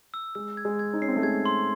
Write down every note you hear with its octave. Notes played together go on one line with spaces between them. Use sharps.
E6
G#3 E6
G#6
G#3
G#6
D#4
C#4 C7
C4
A3
G#3 G#6
C6